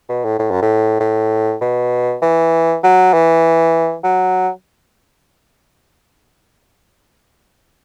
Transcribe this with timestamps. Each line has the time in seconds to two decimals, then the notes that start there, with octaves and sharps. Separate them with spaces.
0.09 B2
0.24 A2
0.39 A2
0.51 F#2
0.62 A2
1.00 A2
1.61 B2
2.22 E3
2.84 F#3
3.13 E3
4.04 F#3